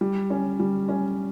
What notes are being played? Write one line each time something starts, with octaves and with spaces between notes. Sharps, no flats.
G3
C#4
G3
C#4